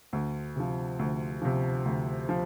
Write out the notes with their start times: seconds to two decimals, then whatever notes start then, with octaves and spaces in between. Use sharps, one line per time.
0.13 D2
0.56 C3 F3
0.99 D2
1.42 C3 F3
1.85 D2
2.29 F3